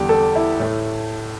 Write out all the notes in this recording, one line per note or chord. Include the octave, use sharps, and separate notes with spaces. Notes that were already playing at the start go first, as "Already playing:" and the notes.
Already playing: E2 D3 G3 G4
A4
E4
A2 A3